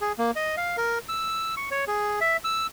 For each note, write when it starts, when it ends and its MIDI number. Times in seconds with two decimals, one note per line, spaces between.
0.01 0.12 68
0.19 0.31 58
0.36 0.55 75
0.57 0.76 77
0.77 0.99 70
1.09 1.55 88
1.57 1.69 85
1.71 1.85 73
1.88 2.19 68
2.21 2.37 76
2.44 2.67 88